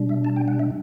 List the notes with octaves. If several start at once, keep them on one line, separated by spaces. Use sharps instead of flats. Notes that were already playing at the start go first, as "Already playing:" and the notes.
Already playing: B2 G3 D4
E5
A5
G5
F#5
E5